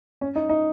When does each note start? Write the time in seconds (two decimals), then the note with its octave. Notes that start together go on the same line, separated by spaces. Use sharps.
0.21 C#4
0.36 D#4
0.49 D#4